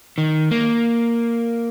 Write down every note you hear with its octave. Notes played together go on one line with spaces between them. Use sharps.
D#3
A#3